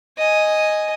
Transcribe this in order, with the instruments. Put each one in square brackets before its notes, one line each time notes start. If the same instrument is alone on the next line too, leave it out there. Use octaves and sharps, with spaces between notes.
[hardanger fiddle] D#5 G#5